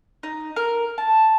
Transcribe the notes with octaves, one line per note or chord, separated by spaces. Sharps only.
D#4
A#4
A5